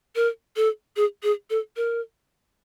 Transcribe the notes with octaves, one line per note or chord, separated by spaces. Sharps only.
A#4
A4
G#4
G#4
A4
A#4